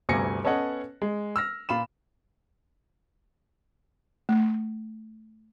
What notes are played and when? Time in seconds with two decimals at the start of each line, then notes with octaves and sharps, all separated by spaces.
0.09 G1 D2 C3 G#5 A#6 C#7
0.44 B3 C#4 A4 C#5 D#5 F#5
1.02 G#3
1.36 E6 F6 A#6
1.69 A#2 F4 B5 E7
4.29 A3